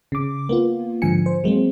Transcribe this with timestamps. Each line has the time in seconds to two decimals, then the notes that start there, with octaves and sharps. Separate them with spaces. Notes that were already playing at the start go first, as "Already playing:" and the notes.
0.12 C#3 D6
0.49 A#3 B3 F4
1.02 G#2 D3 F3 G#5 C#7
1.26 C5
1.44 F#3 G#3 A#3 C4